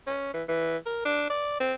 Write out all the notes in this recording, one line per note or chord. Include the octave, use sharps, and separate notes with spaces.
C#4
E3
E3
A#4
D4
D5
C4